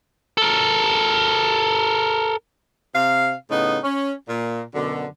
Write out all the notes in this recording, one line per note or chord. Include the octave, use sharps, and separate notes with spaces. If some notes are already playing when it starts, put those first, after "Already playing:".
A4 A#4
C3 F5
A2 C#3 B3 D#4
C#4
A#2
F#2 B2 D3